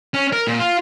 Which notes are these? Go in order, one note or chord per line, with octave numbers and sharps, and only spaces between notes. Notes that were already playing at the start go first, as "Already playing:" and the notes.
C#4
A#4
A#2
F4